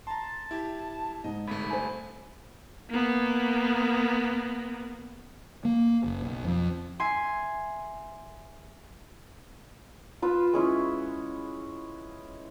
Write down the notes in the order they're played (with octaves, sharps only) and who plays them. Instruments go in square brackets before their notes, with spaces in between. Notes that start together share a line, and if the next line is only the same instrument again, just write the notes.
[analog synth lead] A5 [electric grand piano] A#5 C6
[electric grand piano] E4 G4
[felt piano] G#2 [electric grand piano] D#5
[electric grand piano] G1 C2 A3 [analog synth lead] B5
[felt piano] C5 G#5
[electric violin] A#3 B3
[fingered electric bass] A#3
F#1
B1
F2
[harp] E5 G#5 C6
[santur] F4 B4 E6
G#3 C#4 E4